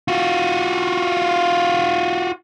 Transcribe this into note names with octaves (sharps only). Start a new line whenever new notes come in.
F4 F#4